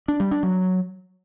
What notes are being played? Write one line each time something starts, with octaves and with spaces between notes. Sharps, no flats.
D4
G3
D4
F#3